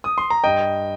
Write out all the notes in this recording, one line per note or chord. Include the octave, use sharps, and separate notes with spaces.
D#6
C6
A#5
G2 D#5 G5